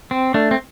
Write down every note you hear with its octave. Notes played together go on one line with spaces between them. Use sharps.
C4
A3 D4
C4